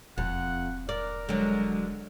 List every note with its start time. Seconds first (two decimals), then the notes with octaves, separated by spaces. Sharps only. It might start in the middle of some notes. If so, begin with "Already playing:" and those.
0.18 E1 F2 F#5
0.89 A#4 D5
1.29 D3 F#3 G#3